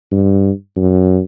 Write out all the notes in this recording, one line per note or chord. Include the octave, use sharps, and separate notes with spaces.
G2
F#2